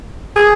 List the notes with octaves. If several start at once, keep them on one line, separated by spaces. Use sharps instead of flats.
G#4